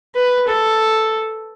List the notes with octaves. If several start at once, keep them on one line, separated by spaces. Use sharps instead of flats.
B4
A4